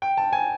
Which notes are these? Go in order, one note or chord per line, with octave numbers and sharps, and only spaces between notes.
G5
A5
G#5